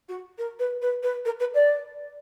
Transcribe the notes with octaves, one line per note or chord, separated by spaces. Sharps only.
F#4
A#4
B4
B4
B4
A#4
B4
D5